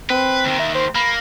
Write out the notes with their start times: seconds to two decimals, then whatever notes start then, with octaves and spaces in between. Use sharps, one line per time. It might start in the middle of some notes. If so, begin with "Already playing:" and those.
0.10 C4 B4
0.45 D#2 D#3
0.59 E5
0.75 C5
0.95 A#3 B5